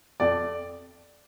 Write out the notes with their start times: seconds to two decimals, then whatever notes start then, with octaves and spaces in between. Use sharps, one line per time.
0.20 F2 D5